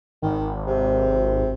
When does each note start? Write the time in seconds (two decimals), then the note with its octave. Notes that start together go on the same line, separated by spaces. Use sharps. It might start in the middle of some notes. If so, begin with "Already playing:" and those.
0.23 G#1 D#3
0.67 C3